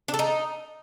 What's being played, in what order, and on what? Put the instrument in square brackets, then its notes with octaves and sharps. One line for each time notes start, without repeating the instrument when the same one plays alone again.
[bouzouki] D4
A4
D#4